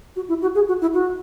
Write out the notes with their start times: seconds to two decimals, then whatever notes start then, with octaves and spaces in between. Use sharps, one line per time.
0.16 F#4
0.29 E4
0.42 F#4
0.55 G#4
0.68 F#4
0.82 E4
0.94 F#4